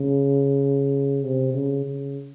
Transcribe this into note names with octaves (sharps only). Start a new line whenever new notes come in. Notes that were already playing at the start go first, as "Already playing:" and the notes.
Already playing: C#3
C3
C#3
C#3